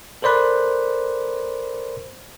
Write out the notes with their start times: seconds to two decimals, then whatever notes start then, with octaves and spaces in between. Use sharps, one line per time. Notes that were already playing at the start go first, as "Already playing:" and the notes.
0.22 A4 A#4 C5 D5 B5 F#6